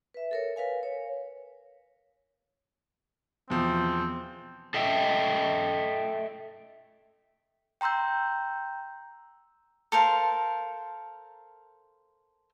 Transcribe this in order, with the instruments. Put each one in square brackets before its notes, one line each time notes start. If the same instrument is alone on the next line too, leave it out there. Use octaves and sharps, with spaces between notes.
[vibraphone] B4 E5
A4 A#4 C#5
A#4 B4 F5 G#5
C#5
[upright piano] E2 B2 F3 [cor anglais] C4
[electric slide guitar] A4 D#5 E5 G5
[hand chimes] G5 A#5 C6 E6 G6
[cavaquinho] A4 A#4 C5 F5